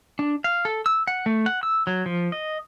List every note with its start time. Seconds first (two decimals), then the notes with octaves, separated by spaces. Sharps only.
0.19 D4
0.44 F5
0.65 A4
0.86 E6
1.07 F#5
1.26 A3
1.46 F#5
1.63 E6
1.87 F#3
2.06 F3
2.32 D#5